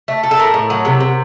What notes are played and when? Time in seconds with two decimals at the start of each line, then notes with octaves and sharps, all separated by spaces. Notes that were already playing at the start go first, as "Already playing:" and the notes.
0.08 A3
0.23 A3
0.31 A4
0.39 A2 A#4
0.54 A2
0.70 F#3
0.85 C3
1.00 C3